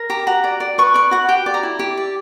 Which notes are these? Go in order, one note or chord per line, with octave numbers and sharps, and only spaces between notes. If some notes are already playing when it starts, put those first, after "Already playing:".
Already playing: A#4
G4 A#5
F#4 A#5
D5
D5
B4 C#6
D5 C#6
F#4 F#5
G4 G5
D5
A#5
E4
G4
D5